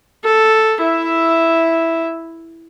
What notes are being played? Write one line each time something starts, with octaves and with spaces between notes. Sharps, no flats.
A4
E4 E5